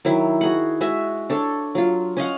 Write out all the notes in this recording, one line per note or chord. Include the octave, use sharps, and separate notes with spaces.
D#3 F#3 E4
F#4 G#4 F#5
G#3 F#4 E5 G#5
D4 A4 C#5 A5
F#3 F4
C#4 D#5 F5 F#5